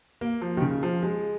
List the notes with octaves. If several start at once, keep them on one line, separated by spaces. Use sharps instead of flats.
A#3
F3
D#3
C#3
F3
G#3